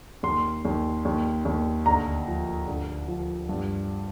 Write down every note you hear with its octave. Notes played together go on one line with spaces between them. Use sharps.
D#2 C6
D#2
D#2
D#2
D2 A#5
F3
D2
F3
G2